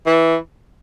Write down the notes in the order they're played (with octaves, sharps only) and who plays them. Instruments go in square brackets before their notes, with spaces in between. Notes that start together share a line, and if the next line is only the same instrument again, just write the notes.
[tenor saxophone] E3